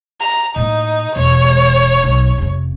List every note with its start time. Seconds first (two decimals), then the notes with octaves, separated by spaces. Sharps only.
0.20 A#5
0.56 A2 A#3 D#4
1.16 E1 C#5
2.03 B1 D#4
2.38 F1 C3